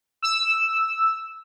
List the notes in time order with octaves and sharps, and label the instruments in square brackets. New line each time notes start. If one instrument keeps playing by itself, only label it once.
[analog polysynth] E6